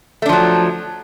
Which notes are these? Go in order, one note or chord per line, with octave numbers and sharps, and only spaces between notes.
F3 F#3 A3 D4